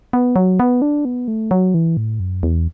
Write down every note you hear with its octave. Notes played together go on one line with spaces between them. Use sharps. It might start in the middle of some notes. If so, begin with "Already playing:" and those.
B3
F#3
B3
D4
B3
A3
F#3
E3
A2
F#2
E2